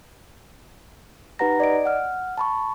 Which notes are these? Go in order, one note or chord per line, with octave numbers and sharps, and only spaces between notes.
D#4 G4 B4 F#5 A#5 A#6
D5 D#5 D7
F#5 F6
A5 B5 C#6